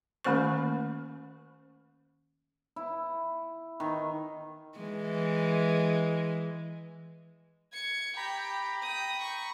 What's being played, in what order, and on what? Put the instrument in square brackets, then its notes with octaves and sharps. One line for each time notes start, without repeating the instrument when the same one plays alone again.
[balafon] D#3 A3 A#3 C#4 C5 C#6
[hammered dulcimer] E4
D#3
[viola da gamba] E3 G#3
[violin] G#6 C#7
[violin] G4 G5 [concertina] A#5 B5
[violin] G5 D#6
C#6